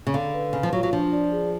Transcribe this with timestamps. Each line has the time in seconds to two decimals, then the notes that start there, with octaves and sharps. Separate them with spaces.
0.07 C#3
0.13 D3 F5
0.34 B4
0.53 C#3 F5
0.63 F3
0.73 F#3 F4
0.83 F#3
0.92 F3 D4
1.13 D5
1.32 G#4